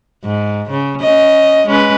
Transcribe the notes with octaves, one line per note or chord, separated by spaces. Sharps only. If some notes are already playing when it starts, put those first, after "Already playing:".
G#2
C#3
C#4 D#5
G#3 C#4 B4